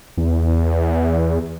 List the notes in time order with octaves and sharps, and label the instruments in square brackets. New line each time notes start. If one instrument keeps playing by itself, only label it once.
[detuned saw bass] E2